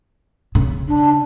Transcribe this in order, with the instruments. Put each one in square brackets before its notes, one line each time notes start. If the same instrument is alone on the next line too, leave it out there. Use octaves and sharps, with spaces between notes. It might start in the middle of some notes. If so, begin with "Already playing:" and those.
[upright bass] C#3
[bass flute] D4